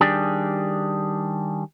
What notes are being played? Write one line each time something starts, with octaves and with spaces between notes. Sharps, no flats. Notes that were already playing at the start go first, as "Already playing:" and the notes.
D#3 G3 D4 G4 G#4